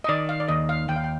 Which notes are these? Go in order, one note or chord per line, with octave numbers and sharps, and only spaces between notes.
D#5
D#3 D5
F5
D5
D#2 D#5
F5
D#2 G5
F5
G5